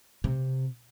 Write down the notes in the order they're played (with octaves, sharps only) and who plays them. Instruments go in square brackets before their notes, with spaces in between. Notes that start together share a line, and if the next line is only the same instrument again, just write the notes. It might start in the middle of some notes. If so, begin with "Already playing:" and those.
[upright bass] C3